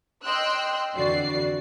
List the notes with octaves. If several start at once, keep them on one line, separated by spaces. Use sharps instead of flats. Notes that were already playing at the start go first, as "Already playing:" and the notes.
D#5 G5 C6 E6 F#6
F2 D3 E3 F#4 D5 C7